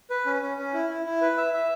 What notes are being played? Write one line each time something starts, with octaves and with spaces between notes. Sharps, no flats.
B4
C#4
C#4
C#4
E4
E4
E4
B4
E5
E5